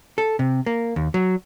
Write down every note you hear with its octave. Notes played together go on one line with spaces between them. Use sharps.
A4
C3
A#3
D#2
F#3